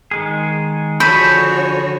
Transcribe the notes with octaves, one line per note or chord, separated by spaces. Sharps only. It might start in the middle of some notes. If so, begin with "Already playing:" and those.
D#3 G#3 G#4
D3 F3 F#4 G#4 C#5 A5 B5 G6